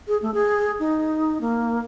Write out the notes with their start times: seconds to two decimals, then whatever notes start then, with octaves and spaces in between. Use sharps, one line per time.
0.08 G#4
0.22 A3
0.34 G#4
0.80 D#4
1.41 A#3